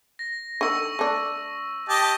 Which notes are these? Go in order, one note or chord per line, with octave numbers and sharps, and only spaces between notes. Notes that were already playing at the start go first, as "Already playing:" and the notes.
A#6
D3 D#3 C#6 E6
A3 D4
G4 D#5 A5